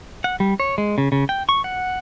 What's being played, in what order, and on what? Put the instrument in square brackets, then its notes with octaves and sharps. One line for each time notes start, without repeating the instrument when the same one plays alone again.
[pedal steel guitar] F#5
G3
C#5
G#3
C#3
C#3
G5
C#6
F#5